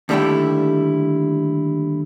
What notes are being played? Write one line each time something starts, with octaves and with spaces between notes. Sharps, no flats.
D#2 D3 G3 A3 E4 G5